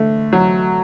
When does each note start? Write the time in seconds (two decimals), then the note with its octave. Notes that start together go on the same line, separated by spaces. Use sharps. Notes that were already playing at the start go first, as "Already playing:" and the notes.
Already playing: D3 A3
0.33 F#3